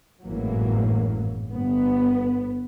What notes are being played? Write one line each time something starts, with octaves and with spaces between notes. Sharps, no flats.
G#1 F#2 A2 E3 F#3 A#3
G1 B3